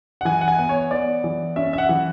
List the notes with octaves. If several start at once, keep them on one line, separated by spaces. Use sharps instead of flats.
F#5
E3 G#5
F#5
G#5
B3
C#5
B3 D5
E3
C#4 E5
E5
F#5
E3